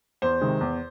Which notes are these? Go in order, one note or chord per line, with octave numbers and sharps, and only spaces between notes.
E2 C5
C3 D#3 G#3
E2